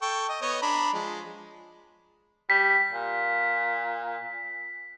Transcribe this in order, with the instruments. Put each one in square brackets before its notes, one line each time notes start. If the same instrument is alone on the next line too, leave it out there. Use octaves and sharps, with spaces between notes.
[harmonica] A4 G5 C#6
D#5
B3 C#5 D#5
D4 A#5 B5
F3 G#3
[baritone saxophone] G3 [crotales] B6
[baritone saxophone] A#2